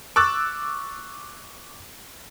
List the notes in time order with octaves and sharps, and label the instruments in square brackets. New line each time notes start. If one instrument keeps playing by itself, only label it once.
[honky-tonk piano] C#6 D6 E6 F#6 A6